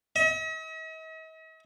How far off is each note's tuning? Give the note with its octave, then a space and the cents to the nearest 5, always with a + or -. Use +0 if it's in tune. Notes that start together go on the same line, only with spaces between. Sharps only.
D#5 +45